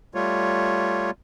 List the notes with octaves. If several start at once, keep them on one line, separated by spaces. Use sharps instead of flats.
G3 A3 F4 C#5